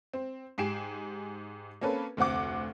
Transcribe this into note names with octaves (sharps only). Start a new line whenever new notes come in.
C4
G#2 G4 G#5 C7 D7 E7
A#3 C4 C#4 A4 B4
F1 D2 C4 F#5 D6